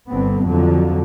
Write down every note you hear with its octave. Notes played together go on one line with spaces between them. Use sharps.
G1 D3 B3 C4
F2 D3 F3 F#3